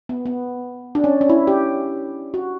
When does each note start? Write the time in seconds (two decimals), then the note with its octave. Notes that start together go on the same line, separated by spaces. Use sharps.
0.09 B3
0.26 B3
0.95 D4
1.04 C#4
1.21 C#4
1.29 E4
1.47 G4
2.34 F#4